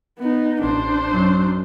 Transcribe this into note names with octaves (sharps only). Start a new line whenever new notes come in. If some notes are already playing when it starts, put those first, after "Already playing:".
B3 D#4
A1 D4 C5
F#2 F#3